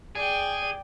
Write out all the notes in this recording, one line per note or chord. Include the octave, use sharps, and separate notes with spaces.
G#4 D5 G5